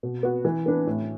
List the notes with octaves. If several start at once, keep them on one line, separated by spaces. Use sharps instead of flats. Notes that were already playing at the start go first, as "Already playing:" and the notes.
B2
B3 F#4
E3
B3 D4 B4
A2